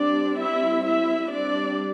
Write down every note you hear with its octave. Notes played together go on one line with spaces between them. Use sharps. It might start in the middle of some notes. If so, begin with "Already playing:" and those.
Already playing: G3 C4 D4 D5
E4 E5
E4 E5
G3 C4 D4 D5